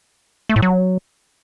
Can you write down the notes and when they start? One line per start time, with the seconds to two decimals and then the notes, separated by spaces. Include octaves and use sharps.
0.49 A3
0.56 A2
0.62 F#3